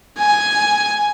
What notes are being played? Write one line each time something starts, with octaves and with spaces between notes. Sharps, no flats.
G#5